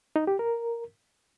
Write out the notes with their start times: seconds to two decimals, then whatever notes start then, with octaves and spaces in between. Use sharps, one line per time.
0.16 D#4
0.27 G4
0.39 A#4